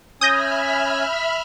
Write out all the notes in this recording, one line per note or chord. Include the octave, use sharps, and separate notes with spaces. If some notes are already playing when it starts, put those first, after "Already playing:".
C#4 E5 G#5 B5 D#6 F6 G6 A#6